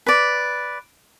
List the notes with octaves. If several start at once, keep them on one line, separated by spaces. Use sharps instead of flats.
B4 D5